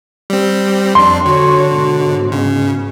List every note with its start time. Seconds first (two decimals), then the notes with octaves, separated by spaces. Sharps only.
0.30 G3 C4
0.95 F2 D4 C6
1.26 D3 F#4 C#5
1.70 G#2 B2
2.32 C#3